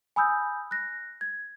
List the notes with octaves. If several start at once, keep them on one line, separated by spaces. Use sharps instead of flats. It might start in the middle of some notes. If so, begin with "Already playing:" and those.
G#5 B5 D#6 E6 G6
F#6 A#6
G#6